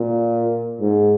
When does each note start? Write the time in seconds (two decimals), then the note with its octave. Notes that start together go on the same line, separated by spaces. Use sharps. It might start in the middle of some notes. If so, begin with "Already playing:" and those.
Already playing: A#2
0.81 G#2